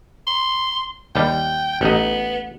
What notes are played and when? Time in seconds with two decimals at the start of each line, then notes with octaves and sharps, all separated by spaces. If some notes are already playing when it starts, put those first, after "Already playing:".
0.27 C6
1.16 D#2 G3 G5
1.81 A1 B3 D#4